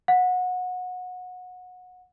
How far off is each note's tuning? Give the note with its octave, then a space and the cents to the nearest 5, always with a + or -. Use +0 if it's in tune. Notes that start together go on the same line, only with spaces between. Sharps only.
F#5 -25